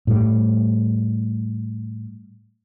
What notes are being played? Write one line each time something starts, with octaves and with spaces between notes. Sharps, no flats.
A2 G3